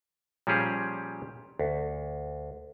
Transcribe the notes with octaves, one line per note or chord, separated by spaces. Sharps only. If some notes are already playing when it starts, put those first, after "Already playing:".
A#2 F3 G3 C#4 G4 G#4
D2